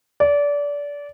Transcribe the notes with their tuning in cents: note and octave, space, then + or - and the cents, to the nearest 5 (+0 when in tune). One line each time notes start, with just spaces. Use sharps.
D5 -25